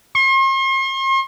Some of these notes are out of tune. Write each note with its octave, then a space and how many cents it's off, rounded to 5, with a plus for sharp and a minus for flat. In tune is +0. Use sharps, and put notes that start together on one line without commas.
C6 +45